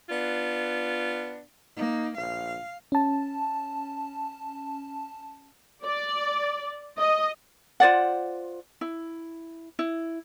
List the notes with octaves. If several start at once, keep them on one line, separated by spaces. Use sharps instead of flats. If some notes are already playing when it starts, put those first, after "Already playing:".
B3 D4 F4
A#3 D#4
A#1 F5
C#4 A5
D5
D#5
F4 C5 D5 F#5
E4
E4